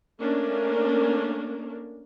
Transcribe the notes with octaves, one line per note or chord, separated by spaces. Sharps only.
A3 A#3 C#4 D4 A#4